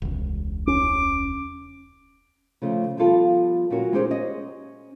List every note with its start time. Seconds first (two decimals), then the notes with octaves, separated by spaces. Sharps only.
0.02 E1 C#2
0.67 C#4 D6
2.62 C#3 F3 A3
2.97 F3 G3 B3 F4 A4
3.70 D2 A#2 F#3 C#4 F#4 A#4
3.93 G#3 C#4 D#4 G4 G#4 C5
4.10 C#4 D#5